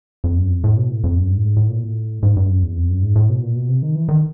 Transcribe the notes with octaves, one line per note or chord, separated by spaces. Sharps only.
F2
F#2
F2
A2
B2
A2
F2
F#2
G2
A2
G#2
A2
A#2
A2
G#2
G2
F#2
E2
F2
F#2
G#2
A2
B2
A#2
B2
C3
D#3
E3
D#3